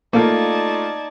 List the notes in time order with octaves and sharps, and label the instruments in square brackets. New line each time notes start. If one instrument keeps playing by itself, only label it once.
[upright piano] A3 F4 [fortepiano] A#3 [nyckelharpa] D#4 D5 [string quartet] A5 G#6